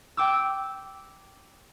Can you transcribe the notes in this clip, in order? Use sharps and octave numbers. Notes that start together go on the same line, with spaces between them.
G5 D6 E6